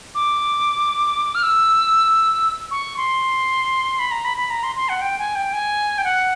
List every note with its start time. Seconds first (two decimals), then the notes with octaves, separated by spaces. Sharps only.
0.15 D6
1.35 F6
1.43 E6
2.71 C#6
2.97 C6
3.99 B5
4.11 A#5
4.25 B5
4.38 B5
4.50 A#5
4.63 C6
4.76 C6
4.89 F#5
5.01 G5
5.19 G#5
5.35 G5
5.53 G#5
5.98 G5
6.04 F#5